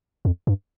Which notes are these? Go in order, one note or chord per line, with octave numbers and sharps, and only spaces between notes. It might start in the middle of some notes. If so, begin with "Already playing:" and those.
F2
G2